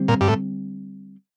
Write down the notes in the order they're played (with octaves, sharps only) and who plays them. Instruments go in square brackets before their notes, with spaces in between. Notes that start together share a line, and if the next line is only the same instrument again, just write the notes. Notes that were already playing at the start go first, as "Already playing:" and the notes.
Already playing: [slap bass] D3 G3 C4
[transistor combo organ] A#2
G2
A2